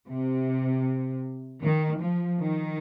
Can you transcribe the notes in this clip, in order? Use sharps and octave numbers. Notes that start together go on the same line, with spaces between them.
C3
D#3
F3
D#3